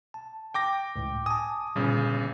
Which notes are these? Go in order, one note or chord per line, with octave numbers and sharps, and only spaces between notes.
A5
G5 D6 A#6
C#2 A2
G#5 A5 D#6
G1 A#2 C#3 G3